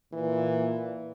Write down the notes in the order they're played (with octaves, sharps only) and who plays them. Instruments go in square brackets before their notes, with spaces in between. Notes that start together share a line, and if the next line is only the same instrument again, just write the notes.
[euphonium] A#2 [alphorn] E3